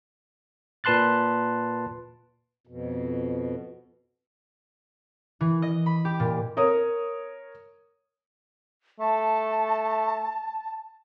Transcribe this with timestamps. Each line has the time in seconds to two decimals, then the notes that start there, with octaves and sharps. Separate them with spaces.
0.84 A#2 B4 A5 C6 F#6 A6
2.67 F2 B2
5.41 E3
5.62 D#5
5.86 B5
6.05 G4
6.20 A#2
6.57 A#4 C#5 D#6
9.00 A3 A5